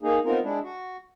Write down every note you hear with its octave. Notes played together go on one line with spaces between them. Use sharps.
A#3 D#4 G#4
B3 C4 D#4 F4 A#4
G#3 D4 E4
F#4